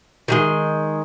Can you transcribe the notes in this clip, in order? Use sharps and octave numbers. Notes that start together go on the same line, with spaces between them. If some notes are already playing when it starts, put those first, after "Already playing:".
D#3 G3 G#3